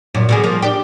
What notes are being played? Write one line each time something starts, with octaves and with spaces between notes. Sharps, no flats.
F#2 A#2
B2 D3 G#4
F3 A#3
D4 G4